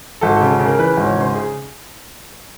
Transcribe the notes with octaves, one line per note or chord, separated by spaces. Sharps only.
G#1 A4
C#3 A4
A4
C#3
A#4
E3 B4
G#1
C#5
C#3 C5
G#4